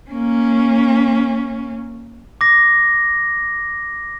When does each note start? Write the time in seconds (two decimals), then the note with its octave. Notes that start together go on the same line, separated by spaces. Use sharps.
0.11 A#3 C#4
2.41 D6 A#6